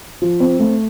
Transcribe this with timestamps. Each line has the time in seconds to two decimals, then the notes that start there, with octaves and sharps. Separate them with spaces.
0.22 F3
0.40 C4
0.59 A3